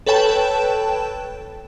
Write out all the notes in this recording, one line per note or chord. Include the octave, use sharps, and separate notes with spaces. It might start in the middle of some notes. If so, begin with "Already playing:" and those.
A4 B4 C#5 G5 A5 E7